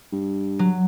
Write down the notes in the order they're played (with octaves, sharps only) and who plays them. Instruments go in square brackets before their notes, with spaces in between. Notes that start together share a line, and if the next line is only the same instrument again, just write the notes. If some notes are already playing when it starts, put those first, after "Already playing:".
[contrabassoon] G2
[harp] F#3